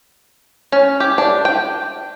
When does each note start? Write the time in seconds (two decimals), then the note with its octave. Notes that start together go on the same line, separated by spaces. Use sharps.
0.72 C#4
1.00 G4
1.18 D4
1.45 G5